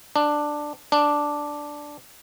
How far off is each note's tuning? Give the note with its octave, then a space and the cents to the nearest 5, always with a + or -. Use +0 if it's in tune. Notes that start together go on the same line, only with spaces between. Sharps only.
D4 +10
D4 +0